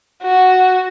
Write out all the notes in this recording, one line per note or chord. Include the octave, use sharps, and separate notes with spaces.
F#4